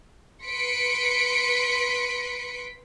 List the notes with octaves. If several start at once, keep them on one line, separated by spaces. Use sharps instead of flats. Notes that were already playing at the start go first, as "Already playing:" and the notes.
B4 C6 B6 C#7 D7